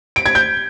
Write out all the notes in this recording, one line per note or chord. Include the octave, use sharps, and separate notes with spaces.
D7
G#6
G6